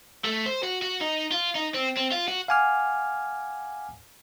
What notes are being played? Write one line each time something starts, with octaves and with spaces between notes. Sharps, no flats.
A3
C5
F#4
F#4
D#4
F4
D#4
C4
C4
F4
F#4
F5 F#5 G#5 D6 F6